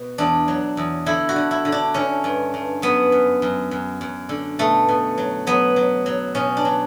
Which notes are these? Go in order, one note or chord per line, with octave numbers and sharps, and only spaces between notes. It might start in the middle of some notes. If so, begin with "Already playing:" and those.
Already playing: B2
E2 D4
F#3
E2
D3 E4
F#4
D3
E4
D3
D4
D3 C#4
G2
G2
F#2 B3
F#2
F#2
F#2
F#2
D3
B2 A3
B2
F#3
F#3 B3
F#3
F#3
B2 C#4
D4
F#3